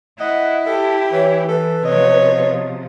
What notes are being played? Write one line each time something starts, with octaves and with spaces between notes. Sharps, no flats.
E4 D#5 F#5
G4 A4 A5
E3 C#5
E3 A4 B4
C3 F3 C#5 D#5